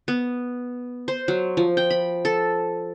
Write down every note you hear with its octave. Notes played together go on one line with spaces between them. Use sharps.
B3
C5
F#3
F3
G5
B5
A4